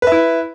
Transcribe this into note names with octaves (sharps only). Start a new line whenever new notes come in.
E4 B4 E5